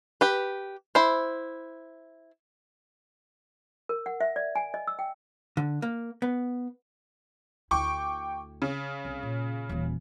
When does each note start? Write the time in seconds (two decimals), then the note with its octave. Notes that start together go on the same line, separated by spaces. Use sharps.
0.21 G4 B4
0.95 E4 C5
3.89 A#4
4.06 F#5
4.21 E5
4.36 D5
4.56 G#5
4.74 D#5
4.88 E6
4.99 G5
5.57 D3
5.82 A#3
6.22 B3
7.71 D2 E4 G5 C#6 D6
8.62 C#3
9.05 C2
9.23 A#2
9.69 D#1 E3